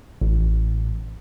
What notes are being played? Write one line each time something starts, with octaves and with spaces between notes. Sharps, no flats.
A1